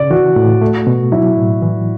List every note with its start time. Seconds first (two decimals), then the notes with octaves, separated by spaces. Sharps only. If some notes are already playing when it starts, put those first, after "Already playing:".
Already playing: C#3 D5
0.11 E3 F#4
0.36 A2
0.61 A3
0.87 B2
1.12 F#3 E4
1.37 A2
1.62 E3